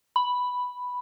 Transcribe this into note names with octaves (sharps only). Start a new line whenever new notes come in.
B5